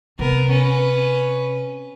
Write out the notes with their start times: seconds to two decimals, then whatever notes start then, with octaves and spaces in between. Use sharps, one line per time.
0.19 C3 B3 A#4
0.50 C#4 B4